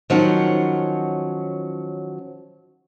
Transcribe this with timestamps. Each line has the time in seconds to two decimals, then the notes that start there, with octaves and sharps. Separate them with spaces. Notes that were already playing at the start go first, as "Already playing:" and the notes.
0.10 D#3 F3 F#3 C#4 F#5